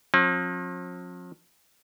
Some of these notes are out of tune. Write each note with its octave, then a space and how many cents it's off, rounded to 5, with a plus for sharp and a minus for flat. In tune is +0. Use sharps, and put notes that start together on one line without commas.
F3 +40 C4 +45